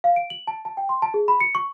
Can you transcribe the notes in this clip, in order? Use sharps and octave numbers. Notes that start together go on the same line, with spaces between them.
F5
D7
F#7
A5
A5
G5
C6
A5
G#4
B5
C#7
C#6